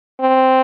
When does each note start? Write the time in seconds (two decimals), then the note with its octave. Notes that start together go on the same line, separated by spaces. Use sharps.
0.21 C4